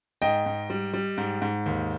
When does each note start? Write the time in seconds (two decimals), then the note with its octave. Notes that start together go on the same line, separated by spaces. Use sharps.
0.22 G#2 D#5 G5
0.46 G#2
0.70 G3
0.93 G3
1.18 G#2
1.42 G#2
1.66 D#2